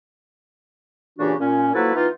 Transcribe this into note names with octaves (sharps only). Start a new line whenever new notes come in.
A#2 C#3 E3 D4 F#4 G4
A#2 C#4
F3 F#3 A#3 E4 A4 B4
E3 B3 D#4 F4